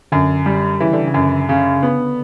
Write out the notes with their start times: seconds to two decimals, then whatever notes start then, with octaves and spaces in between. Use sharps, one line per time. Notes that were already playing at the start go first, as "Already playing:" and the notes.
0.12 F#2 D3
0.46 G3
0.80 C#3 E3
0.93 D3
1.07 C#3
1.14 F#2
1.49 C#3
1.83 B3